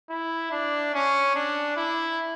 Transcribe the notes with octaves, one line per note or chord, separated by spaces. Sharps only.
E4
D4
C#4
D4
E4